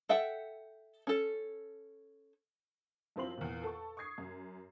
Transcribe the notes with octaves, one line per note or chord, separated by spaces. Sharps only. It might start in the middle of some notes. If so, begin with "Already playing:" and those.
A4 E5 F#5 G5
C#4 A4
F#2 F3 C4 E4 C6 F#7
E2 A#2
A4 C#6
C#6 D#6 G#6 C7
F#2